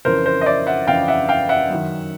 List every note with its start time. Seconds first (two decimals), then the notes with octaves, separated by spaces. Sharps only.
0.05 F2 C#3 E3 A#4 C5
0.26 A#4 C5
0.41 D#5
0.46 D5 E5
0.67 E5 F#5
0.87 F2 C#3 E3 F5 G5
1.08 E5 F#5
1.29 F5 G5
1.49 E5 F#5
1.70 F#2 D#3